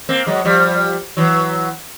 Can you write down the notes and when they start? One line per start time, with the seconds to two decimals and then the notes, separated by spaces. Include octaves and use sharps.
0.09 A#3 C4
0.27 F#3 G#3
0.45 F3 G3
1.17 E3 F#3